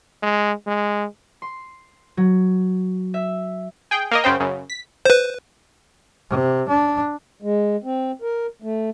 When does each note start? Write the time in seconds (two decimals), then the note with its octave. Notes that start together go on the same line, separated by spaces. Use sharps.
0.23 G#3
0.67 G#3
1.42 C6
2.17 F#3
3.14 E5
3.91 G#4 G5
4.11 A#3 A#4 D#5
4.24 F#2 C#3 C5 G5
4.40 F#2 C#3
4.70 B6
5.05 B4 C5
6.30 C3
6.69 D4
7.42 G#3
7.84 C4
8.22 A#4
8.62 A3